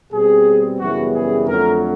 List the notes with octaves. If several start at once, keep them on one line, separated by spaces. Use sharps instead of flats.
B2 G3 C4 G#4
F#2 C#3 E3 G3 B3 F#4
G#4
F2 D3 F#3 A3 A#4